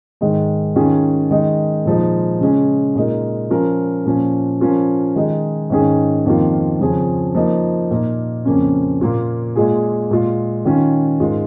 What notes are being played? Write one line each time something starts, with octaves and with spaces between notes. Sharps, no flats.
G#2 D#3 G#3
D#3 C#4 F4 G#4
D#3 G#3 D#4
A#2 F3 G#3 D#4
C#3 G#3 C#4
A#2 G#3 D#4 A#4
F3 C#4 F4 A#4
A#2 F3 C#4 F4
F3 C#4 F4 A#4
D#3 G#3 D#4 G#4
G#2 D#3 C#4 G#4
F2 D#3 A#3 F4
F2 C#3 F3 C#4 G#4
F3 A#3 D#4
A#2 A#3 D#4 A#4
F2 C#3 A#3 C#4
A#2 A#3 F4 A#4
A#2 G#3 F4 G#4
A#2 G#3 F4
D#3 C#4 F4
G#2 G#3 F4 A#4